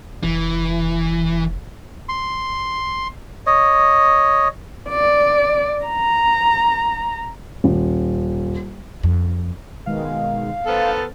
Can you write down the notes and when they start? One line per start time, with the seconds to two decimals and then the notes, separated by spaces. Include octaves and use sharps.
0.23 F1 E3
2.09 C6
3.47 C#5 D#5
4.89 D5
5.85 A#5
7.64 D#1
9.03 F2
9.86 B2 D#3 G#3 F5
10.67 B3 A4 C5 F6 A6